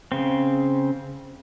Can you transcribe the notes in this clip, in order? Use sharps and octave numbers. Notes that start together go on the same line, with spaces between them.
C#3 C4